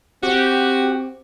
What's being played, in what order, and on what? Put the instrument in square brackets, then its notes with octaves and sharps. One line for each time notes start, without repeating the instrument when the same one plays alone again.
[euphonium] C4 [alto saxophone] F#4 [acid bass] G4